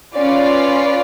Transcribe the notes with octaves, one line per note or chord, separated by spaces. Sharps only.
C#4 F4 B4 D5